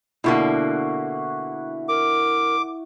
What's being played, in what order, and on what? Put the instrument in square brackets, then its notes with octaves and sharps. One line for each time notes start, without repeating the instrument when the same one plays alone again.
[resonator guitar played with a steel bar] B2 D3 A#3 [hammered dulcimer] E4 F#4
[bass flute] A#4 [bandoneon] D6